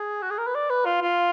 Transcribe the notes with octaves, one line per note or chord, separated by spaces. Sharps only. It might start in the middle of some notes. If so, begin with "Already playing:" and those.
Already playing: G#4
F#4
G#4
A#4
B4
D5
B4
F4
F4